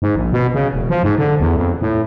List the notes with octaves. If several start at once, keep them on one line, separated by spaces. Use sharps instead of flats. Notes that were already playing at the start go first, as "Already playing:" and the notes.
G#2
A#1
B2
C#3
E1
F3
G#2
D3
E2
F2
A2